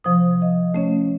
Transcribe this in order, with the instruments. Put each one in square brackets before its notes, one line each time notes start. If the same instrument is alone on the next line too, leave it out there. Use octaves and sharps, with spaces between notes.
[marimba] C3 F3 C5 D#6
D#5 F5
A3 C#4 C#5